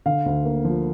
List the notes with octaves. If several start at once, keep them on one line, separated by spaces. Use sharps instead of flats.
D3 F5
D2
A#3
F3